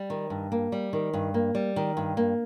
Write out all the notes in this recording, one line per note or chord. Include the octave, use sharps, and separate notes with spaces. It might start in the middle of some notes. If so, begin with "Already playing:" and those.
Already playing: G3
D#3
G2
A#3
G3
D#3
G2
A#3
G3
D#3
G2
A#3